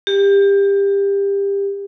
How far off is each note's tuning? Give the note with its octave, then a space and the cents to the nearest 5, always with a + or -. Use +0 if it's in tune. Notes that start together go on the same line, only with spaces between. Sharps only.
G4 +25